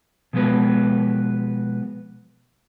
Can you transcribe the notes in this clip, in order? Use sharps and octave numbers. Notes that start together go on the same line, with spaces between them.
B2 F3 G#3 B3 B4